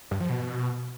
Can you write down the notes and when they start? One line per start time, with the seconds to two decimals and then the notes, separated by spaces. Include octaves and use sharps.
0.11 G2
0.20 F3
0.30 B2